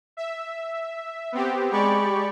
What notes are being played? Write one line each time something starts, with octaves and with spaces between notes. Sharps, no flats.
E5
B3 C4 G4
G#3 G4 D5 B5 C#6